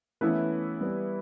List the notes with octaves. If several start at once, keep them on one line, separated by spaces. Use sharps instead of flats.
E3 A3 B3 C#4 E4 B4
G3 B3